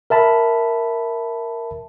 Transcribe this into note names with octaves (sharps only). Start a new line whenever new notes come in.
A#4 E5 A5 B5